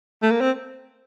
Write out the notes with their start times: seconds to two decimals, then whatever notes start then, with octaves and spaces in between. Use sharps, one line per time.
0.22 A3
0.31 A#3
0.40 C4